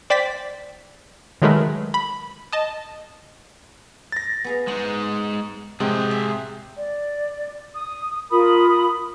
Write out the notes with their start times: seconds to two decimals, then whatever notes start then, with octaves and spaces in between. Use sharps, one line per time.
0.10 C5 D5 G5 A6 B6
1.42 D#3 F#3 G#3 A3 A#4 B4
1.94 B5
2.53 D#5 A5
4.12 A6 A#6
4.44 B3 G#4 F5
4.68 G#3 D#4 F#5
5.80 A2 C3 F3 G#3 F#4 G#4 G5
6.11 E5
6.76 D5
7.74 D#6
8.30 F4 A#4 B5 D#6